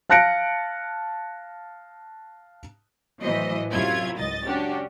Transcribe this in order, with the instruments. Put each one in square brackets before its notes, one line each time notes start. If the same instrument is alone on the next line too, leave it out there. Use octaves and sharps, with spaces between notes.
[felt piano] F5 A5 F#6 A#6 C#7 D7
[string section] A2 E3 F#3 C5 D#5
F#2 C3 F#3 E4 F4 G#6
C#2 G#2 D#5 A6
C#4 D4 F#4 G4